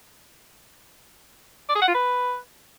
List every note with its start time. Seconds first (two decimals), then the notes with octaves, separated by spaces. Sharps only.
1.69 D5
1.75 G#4
1.82 F#5
1.88 F4
1.94 B4